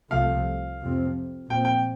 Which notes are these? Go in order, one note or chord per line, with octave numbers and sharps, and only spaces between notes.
C2 C3 F3 A3 F5
F2 C3 F3 C4
A#2 F3 C4 G5
G5